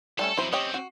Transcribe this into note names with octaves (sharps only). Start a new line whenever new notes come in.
G3 A3 C#4 A4
F2 F#3 E4 C5
C4 C#4 G4 C#5 D#5
F#4